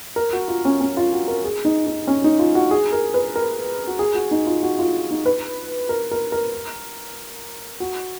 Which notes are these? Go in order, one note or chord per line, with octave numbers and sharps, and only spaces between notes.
A#4
F#4
F4
C#4
C#4
F4
F#4
A#4
G#4
D#4
D#4
C#4
D#4
F4
F#4
G#4
A#4
B4
A#4
F#4
G#4
F#4
D#4
F4
F#4
F4
D#4
B4
A#4
A#4
A#4
F#4